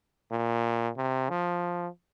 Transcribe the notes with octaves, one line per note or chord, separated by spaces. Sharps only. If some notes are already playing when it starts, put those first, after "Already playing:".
A#2
C3
F3